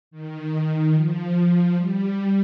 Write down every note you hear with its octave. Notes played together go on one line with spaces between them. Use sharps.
D#3
F3
F3
G3